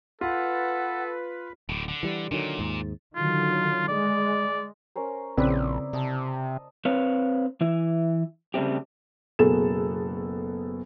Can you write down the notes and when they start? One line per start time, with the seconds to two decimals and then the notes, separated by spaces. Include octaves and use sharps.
0.21 F4 A4 B4 F#5
1.69 D1 A2 D3
1.88 D3
2.03 E3 G3
2.31 A#2 D3 D#3 F#3
2.59 D#2 G#2
3.16 D3 D#3 F#3 F4
3.88 G#3 D5
4.96 C#4 A#4 C5
5.38 A#1 C#3 C4 E4 B4 D5 D#5
5.93 C3 D#5 A5
6.85 C4 B4 C#5 F5
7.61 E3 E4
8.54 C#3 G3 A3 C4 G4
9.39 F#1 B2 G#4 A4 E7